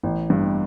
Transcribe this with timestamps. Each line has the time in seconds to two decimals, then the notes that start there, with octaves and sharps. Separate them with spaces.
0.03 A1
0.30 G2